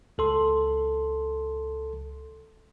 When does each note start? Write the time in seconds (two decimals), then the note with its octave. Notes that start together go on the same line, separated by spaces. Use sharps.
0.18 C#2 A4 C6